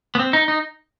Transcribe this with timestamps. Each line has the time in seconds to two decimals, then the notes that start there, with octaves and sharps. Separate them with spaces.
0.15 B3
0.19 C4
0.33 D#4
0.48 D#4